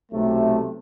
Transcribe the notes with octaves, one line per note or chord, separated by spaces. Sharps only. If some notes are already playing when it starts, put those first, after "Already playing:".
B1 C3 A3